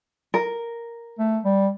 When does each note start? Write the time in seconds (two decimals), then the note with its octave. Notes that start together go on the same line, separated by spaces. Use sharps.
0.34 A#4
1.19 A3
1.44 G3